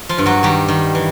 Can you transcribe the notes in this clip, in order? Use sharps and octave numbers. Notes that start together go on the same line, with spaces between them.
F3 F4
G2
F#3 F#4
D#3 G3 G4
D#3
E3